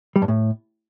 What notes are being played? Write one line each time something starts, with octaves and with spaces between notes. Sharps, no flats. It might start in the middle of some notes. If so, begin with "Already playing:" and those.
G3
G2
A2